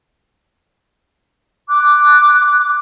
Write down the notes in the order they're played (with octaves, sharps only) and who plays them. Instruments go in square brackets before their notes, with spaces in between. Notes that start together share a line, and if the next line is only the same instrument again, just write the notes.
[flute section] D6 F#6